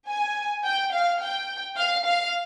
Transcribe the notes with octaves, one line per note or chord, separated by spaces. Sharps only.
G#5
G5
F5
G5
F5
F5